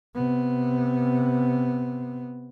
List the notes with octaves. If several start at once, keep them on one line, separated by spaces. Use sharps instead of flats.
C3 B3